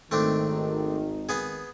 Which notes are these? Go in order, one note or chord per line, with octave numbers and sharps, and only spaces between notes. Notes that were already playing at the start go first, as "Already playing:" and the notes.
G#1 D#3 A3 C4 D4
B3 G#4